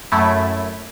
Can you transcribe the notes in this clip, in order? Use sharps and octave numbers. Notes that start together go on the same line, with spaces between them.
F#2 A3 E4